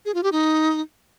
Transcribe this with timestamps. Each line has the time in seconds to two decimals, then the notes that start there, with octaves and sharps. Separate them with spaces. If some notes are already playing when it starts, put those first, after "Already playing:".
0.05 G#4
0.14 F4
0.23 G4
0.32 D#4